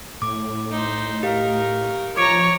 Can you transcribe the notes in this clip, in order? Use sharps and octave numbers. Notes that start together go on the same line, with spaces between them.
A2 D6
D#4 C5
D#4 G4 A#4 F5
F3 C#5 A#5 C#6 D6 C#7 D7